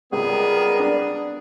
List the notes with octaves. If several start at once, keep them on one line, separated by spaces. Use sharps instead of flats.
C#2 G3 B3 G#4 A#4
D4